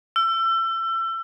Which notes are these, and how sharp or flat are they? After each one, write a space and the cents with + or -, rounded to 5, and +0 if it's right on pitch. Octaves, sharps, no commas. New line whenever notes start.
E6 +30